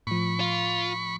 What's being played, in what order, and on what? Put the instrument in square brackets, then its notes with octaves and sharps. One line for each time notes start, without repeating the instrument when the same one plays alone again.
[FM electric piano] A2 F3 [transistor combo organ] B5 C#6
[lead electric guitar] F4